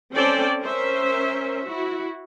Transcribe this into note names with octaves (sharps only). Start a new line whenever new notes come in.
C4 C#4 A4 C5 D5 G5
C#4 A#4 C5 E5
E4 F#4